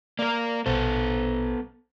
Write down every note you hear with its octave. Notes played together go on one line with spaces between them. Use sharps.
A#3 A#4 D5
A#1 B2 B3 A4 C5